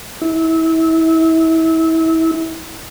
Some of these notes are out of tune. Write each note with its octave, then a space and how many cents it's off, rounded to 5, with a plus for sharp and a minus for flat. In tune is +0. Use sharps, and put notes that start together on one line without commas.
E4 -30